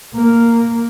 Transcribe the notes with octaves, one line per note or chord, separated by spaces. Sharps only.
A#3